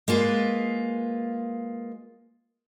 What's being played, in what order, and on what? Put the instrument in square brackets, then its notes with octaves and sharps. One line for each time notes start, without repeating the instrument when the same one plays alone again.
[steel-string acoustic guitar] G#3 A#3 F4 B4